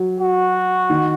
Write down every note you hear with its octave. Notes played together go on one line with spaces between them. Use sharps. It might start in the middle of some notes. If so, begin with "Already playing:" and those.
Already playing: F#3
F#4
D#3